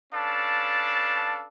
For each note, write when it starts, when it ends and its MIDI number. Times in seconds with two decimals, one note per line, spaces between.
0.13 1.46 61
0.13 1.46 62
0.13 1.46 69
0.13 1.46 71
0.13 1.46 77
0.13 1.46 81